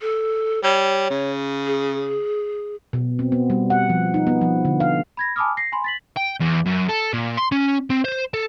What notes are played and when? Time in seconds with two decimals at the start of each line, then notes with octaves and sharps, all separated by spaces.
0.01 A4
0.63 G3 C#5
1.10 C#3
1.67 G#4
2.93 B2
3.19 C4
3.32 B3
3.50 G3
3.70 F#5
3.90 F3
4.14 D#4
4.27 B3
4.41 F3
4.65 D3
4.80 F5
5.17 B5 G#6 A#6
5.36 G#5 A5 B5 D6 D#6 F6
5.57 A#6 C7
5.72 G#5 B5 C6
5.84 A6 B6 F#7
6.16 G5
6.40 E2
6.66 F#2
6.89 A4
7.13 A#2
7.37 C6
7.52 C#4
7.90 C4
8.05 C5
8.34 A4